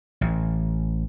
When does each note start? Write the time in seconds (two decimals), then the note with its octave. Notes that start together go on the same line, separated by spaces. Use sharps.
0.21 A1